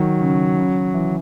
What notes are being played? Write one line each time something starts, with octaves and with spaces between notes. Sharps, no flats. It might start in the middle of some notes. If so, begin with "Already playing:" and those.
Already playing: D#3 F#3
C#3
C#3
E3